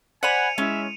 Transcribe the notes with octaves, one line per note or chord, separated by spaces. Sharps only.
C5 D5 F#5 G#5 B5 C#7 D#7 F7
G#3 C#4 E4 E5